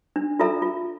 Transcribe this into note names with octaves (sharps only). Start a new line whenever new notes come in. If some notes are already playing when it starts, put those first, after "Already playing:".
D4
F4 A4 E5 A#5
F4